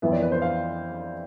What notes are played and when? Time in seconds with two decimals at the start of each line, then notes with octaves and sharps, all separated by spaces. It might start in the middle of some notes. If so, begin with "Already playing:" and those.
0.02 F2 E3 B3 E5
0.12 D5
0.22 B4
0.32 C5
0.42 F5